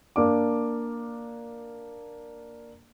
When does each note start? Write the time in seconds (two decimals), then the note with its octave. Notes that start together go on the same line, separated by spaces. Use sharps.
0.16 A#3 D4 D6